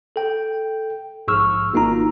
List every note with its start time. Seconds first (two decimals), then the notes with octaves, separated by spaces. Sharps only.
0.16 A4 G5
1.28 A#1 G#2 C#6 E6 F6
1.74 G#1 A#3 D#4 F4 A#5